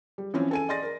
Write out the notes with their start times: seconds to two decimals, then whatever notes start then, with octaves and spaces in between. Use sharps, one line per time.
0.18 G3
0.34 E3 F3 C4 C#4
0.51 A4 G#5 D#7
0.69 D5 D#5 C6 A6 A#6
0.83 A#4